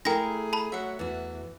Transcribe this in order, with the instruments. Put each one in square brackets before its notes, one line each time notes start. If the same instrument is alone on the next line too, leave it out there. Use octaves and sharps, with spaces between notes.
[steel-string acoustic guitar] A3 [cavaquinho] E4 A#4 [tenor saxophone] G#4 [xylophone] G5 A#6
[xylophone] A5 B5
[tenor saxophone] F#3 [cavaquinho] E5 F#5
[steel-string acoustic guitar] E2 F#4 [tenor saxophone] E3